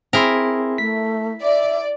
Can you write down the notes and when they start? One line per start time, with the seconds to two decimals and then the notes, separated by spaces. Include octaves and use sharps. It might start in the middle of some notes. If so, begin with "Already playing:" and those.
0.13 C4 E4 G#4 A#4 C6
0.78 A3 B6
1.43 D5 E5